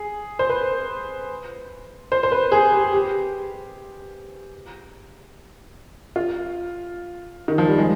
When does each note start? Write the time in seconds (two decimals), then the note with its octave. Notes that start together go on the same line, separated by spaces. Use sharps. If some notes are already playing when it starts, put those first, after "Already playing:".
Already playing: G#4
0.39 C5
0.49 B4
2.12 C5
2.23 C5
2.32 B4
2.52 G#4
2.72 G4
2.93 G4
6.16 F4
7.48 D#3
7.58 F3
7.67 G3
7.78 G#3